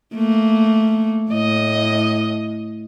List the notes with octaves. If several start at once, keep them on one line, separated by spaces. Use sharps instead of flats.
A3 A#3
A2 D#5